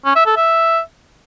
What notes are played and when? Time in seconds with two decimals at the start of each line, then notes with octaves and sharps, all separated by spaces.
0.05 C#4
0.16 E5
0.26 A4
0.36 E5